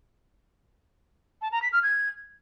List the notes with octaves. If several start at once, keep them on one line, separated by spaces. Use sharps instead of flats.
A5
A#5
B6
F6
G#6